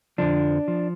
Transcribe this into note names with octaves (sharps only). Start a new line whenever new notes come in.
F2 D3 F3 D4
F3